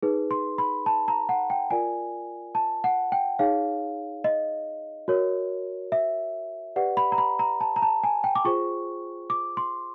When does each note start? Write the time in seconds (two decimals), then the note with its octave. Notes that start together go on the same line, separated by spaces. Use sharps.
0.03 D#4 G#4 B4
0.31 C6
0.58 B5
0.86 A5
1.08 A#5
1.29 F#5
1.50 G5
1.71 F4 A#4 D5 G#5
2.55 A5
2.84 F#5
3.12 G5
3.39 D#4 G#4 C#5 F5
4.24 D#5
5.08 F#4 A#4 C#5
5.92 E5
6.76 G4 B4 D5 F#5
6.97 B5
7.12 A#5
7.18 B5
7.39 A#5
7.61 A5
7.76 A#5
7.82 A5
8.04 G#5
8.24 G5
8.36 D6
8.45 F4 G#4 C5 C#6
9.30 D6
9.57 C6